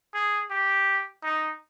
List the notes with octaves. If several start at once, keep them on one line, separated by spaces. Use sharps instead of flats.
G#4
G4
D#4